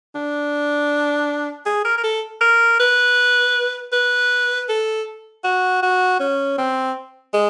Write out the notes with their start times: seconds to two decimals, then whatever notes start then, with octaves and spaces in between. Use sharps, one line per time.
0.15 D4
1.66 G#4
1.85 A#4
1.98 A#4
2.03 A4
2.41 A#4
2.79 B4
3.92 B4
4.69 A4
5.44 F#4
5.82 F#4
6.20 C#4
6.58 C4
7.34 G#3